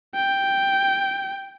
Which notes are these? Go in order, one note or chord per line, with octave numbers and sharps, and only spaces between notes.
G5